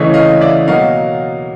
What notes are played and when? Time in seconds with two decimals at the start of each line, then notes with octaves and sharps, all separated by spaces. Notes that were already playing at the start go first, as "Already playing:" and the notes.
Already playing: C#3 E3 A3 C#5 D#5
0.14 D#5 F5
0.41 D5 E5
0.68 B2 F#3 A#3 D#5 F5